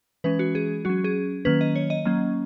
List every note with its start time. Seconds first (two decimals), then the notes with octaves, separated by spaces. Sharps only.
0.24 E3 G#3 C#4 B4
0.39 F#4
0.55 G#4
0.85 F#3 C#4 F#4
1.04 G#4
1.45 D#3 F#3 A#3 C#4 B4
1.61 D#5
1.76 C#5
1.90 D#5
2.05 F#3 A#3 C#4